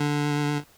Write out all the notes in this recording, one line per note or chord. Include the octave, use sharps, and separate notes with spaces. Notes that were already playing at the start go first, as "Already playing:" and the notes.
Already playing: D3